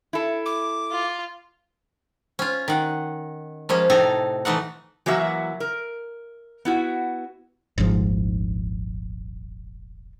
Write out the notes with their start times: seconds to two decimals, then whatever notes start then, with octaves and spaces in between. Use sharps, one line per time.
0.13 E4 A4
0.45 D6
0.92 F4
2.39 C#4 F4
2.68 D#3 F#5
3.69 F3 G#3 A#3 C#4
3.90 A2 C3 D#4 A4 G#5 A#5
4.45 E3 A3 D#4 F#5
5.06 E3 F#3 A#3 F#4 E5
5.60 A#4
6.65 B3 E4 F#4
7.78 D#1 G#1 G#2 F3